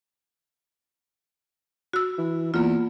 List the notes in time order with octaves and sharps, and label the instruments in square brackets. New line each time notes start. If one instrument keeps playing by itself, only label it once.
[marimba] F#4 E6
[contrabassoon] E3
[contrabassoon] E2 [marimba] A#3 F4